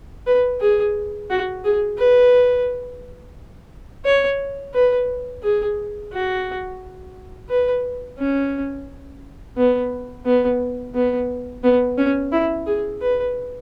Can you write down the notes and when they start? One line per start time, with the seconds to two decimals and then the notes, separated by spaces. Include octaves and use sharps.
0.27 B4
0.60 G#4
1.30 F#4
1.64 G#4
1.98 B4
4.05 C#5
4.74 B4
5.43 G#4
6.12 F#4
7.49 B4
8.19 C#4
9.57 B3
10.25 B3
10.95 B3
11.63 B3
11.98 C#4
12.32 E4
12.67 G#4
13.01 B4